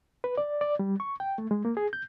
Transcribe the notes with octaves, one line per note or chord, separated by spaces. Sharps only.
B4
D5
D5
G3
C#6
G5
A3
G#3
A#3
G#4
G6